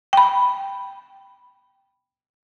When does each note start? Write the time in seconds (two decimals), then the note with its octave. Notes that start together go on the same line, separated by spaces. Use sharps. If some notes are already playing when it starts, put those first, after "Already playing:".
0.13 G5 B5